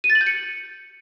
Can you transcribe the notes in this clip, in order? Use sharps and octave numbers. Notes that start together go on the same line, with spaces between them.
D#7
A6
F#7
G6
C#7